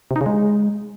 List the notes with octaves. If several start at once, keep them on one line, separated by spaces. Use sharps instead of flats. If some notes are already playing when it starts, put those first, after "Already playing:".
C3
D#4
C#3
G#3